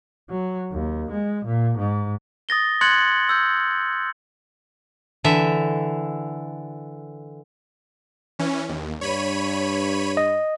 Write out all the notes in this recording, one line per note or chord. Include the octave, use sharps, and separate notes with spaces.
F#3
D#2
G#3
A#2
G#2
D#6 A6 A#6 G7
C6 F#6 G#6 A6 C#7 F#7
E6 G6
D3 E3 E5
E3 C#4
D#2
G2 C#5 B5 D#7
D#5